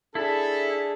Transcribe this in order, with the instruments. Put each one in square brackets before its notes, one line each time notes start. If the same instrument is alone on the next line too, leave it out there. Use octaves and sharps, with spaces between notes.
[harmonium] D4 G#4 [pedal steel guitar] E4 [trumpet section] A4